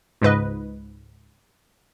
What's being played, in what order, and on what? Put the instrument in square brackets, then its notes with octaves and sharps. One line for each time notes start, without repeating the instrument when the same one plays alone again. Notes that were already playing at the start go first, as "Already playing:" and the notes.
[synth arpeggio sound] C#2 G#2 B4 D#5